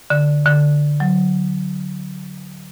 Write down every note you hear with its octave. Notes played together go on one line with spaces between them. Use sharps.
D3
D3
F#3